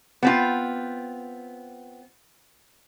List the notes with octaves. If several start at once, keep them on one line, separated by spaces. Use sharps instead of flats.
B3 C4 F4